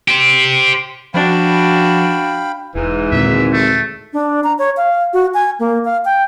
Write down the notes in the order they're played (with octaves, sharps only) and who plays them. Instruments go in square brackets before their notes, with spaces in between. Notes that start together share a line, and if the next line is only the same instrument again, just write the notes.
[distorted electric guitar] G4 C5
[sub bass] F3 [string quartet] D4 F#4 [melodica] F5 G5 B5
[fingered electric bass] E1 [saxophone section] G#2 E3
[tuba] G#1 [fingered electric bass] D#2 A#2 D3 [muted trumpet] E5
[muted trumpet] A3
[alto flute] D4
A#5
C#5
F5
F#4
G#5
A#3
F5
G5